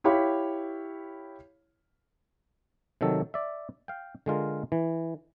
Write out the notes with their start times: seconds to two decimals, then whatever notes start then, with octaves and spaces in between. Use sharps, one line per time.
0.04 E4 G4 C#5 F5 B5
3.01 C3 D#3 F#3 A4
3.34 D5 E5
3.88 F5 G5
4.26 D3 G#3 F4 A#4
4.72 E3